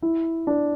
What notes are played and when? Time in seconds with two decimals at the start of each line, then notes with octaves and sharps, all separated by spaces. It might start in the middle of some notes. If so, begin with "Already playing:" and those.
0.02 E4
0.47 D4